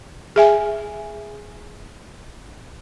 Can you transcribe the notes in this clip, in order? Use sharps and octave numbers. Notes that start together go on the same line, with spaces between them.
G#4 E5 G#5